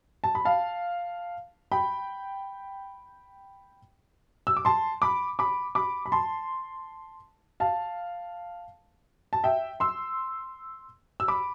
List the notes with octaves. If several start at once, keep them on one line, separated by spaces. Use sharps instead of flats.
A5
B5
F5 A5
G5 B5
E6
D6
A5 C6
B5 D6
B5 D6
B5 D6
B5
A5 C6
F5 A5
A5
E5 G5
C6 E6
E6
B5 D6